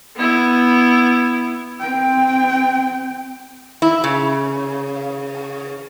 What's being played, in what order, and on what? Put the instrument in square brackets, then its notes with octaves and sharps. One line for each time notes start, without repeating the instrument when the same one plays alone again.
[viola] B3 E4
[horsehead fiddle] C4 G5
[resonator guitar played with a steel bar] E4
C#3